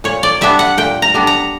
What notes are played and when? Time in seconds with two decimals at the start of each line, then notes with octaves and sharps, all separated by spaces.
0.04 A#2 C#5
0.23 D5
0.41 G3 B3 D4 E5
0.59 F#5
0.78 A#2 G5
1.02 A#5
1.14 G3 B3 D4
1.27 A#5